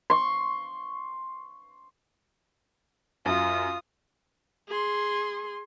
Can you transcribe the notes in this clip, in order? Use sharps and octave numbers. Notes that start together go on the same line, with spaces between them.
C6 C#6
F#2 F4 D#6
G#4 C6